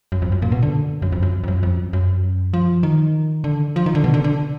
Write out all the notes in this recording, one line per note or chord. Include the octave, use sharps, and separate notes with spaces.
F#2
F2
F#2
A#2
B2
D3
F#2
F2
F#2
F2
F#2
F2
F#2
F3
D#3
D3
F3
D#3
D3
B2
D3
D3